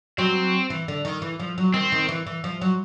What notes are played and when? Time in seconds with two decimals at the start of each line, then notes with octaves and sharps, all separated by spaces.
0.18 F#3 C4
0.70 E3
0.88 D3
1.05 D#3
1.22 E3
1.40 F3
1.58 F#3
1.74 D#3 C4
1.92 D#3
2.09 E3
2.27 E3
2.44 F3
2.61 F#3